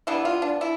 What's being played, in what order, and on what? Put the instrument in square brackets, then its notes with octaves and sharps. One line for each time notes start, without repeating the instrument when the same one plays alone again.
[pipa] E3 G3 B3 D4 E4
F4
D4
D4 E4